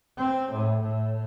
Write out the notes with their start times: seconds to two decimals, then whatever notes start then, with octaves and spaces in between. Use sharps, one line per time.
0.17 C4
0.52 A2
0.82 A2